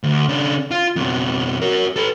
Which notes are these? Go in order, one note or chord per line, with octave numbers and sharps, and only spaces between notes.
D2
C#3 D4
F4
F2 B2
F#4 A#4
A4 B4